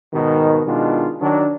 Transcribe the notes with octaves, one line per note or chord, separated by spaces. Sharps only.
G#2 B2 D#3
B2 D#3 G#3 D4 F4
D#3 F#3 D4